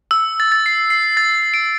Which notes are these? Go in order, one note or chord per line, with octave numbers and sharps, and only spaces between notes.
E6
A6
A6
C7
C7
A6
D7